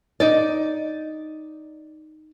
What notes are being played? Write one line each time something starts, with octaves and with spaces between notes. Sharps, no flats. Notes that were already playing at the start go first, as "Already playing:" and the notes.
D#4 D5